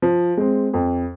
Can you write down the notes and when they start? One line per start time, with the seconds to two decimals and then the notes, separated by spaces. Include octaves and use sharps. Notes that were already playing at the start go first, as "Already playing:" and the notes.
0.02 F3
0.37 G#3 C4
0.74 F2